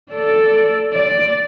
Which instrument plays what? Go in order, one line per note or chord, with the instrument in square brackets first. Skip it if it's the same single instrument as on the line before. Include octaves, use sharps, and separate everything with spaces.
[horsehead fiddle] A4 D5
D5